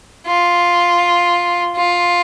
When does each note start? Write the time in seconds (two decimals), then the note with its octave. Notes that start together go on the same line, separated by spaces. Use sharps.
0.27 F4
1.76 F4